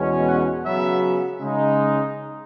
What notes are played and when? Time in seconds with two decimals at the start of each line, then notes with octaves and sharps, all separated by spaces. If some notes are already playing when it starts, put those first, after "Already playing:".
Already playing: E2 B2 G#3 C#4
0.26 F#5
0.64 C#3 F#3 B3 E5
1.41 C#3 G#3 D#4